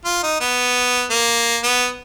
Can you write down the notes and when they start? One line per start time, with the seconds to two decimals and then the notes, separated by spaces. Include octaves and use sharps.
0.05 F4
0.23 D#4
0.41 B3
1.11 A#3
1.63 B3